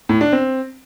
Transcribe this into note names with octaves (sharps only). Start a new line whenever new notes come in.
A2
D4
C4